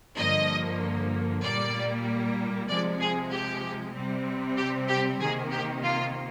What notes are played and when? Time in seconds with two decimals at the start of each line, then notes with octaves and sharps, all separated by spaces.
0.17 G2 D3 F3 A#3 D#5
1.43 A#2 G3 A#3 D5
2.68 C3 F3 G#3 D5
3.00 G#4
3.31 G4
3.94 C3 G3 C4
4.57 G4
4.89 G4
5.20 C3 D#3 A#3 G#4
5.51 G4
5.84 F4